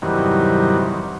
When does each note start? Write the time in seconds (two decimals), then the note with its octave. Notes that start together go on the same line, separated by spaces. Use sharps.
0.02 E2 G2 C3 D#3 F#3